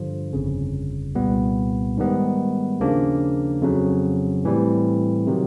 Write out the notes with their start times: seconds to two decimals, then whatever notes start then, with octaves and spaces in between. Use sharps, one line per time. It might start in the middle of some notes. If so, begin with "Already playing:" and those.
Already playing: G2 D3 F3
0.33 G1 F2 C#3
1.15 C2 A#2 G3 B3
1.97 G#2 D#3 G3 B3
2.80 D#2 C#3 F3 A#3 D4
3.61 F2 C#3 F#3
4.44 A2 E3 G3 C4
5.27 C3 D#3 F#3